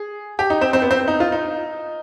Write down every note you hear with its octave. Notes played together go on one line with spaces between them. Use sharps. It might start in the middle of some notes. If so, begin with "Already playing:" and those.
Already playing: G#4
G4
D#4
C4
C4
B3
C4
D#4
F4
D#4